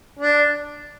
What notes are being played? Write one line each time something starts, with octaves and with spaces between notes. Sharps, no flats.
D4